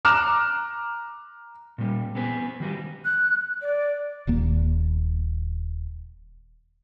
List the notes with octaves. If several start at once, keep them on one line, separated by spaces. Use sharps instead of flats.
A#5 D6 F6 F#6 E7
A#2 G3
B3 C4 G#4 B4
D#3 G3 F#4 B4
F#6
D5
D#1 D#2 A#3